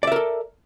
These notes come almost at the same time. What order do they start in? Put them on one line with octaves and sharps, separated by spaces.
D5 E5 A#4 A4